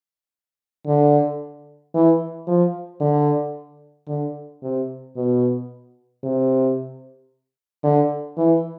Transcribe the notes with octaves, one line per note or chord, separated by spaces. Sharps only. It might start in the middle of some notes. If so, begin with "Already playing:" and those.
D3
E3
F3
D3
D3
C3
B2
C3
D3
E3